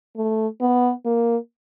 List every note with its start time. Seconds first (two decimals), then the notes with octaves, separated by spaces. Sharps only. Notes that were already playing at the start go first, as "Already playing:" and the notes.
0.16 A3
0.61 B3
1.05 A#3